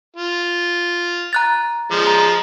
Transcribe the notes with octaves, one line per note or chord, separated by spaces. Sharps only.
F4
A#5 F#6 A6
F3 G#3
A#5